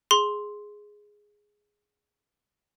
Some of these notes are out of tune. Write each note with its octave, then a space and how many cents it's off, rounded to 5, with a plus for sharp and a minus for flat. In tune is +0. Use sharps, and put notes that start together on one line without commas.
G#4 +0 C6 +0